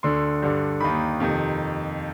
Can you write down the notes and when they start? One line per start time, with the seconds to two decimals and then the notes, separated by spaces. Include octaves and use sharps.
0.03 D2 D3 C6
0.42 G2 D3
0.81 D#2 D#3 B5
1.20 F2 C3 D#3